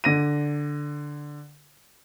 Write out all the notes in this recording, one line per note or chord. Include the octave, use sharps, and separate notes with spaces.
D3 A#6 D#7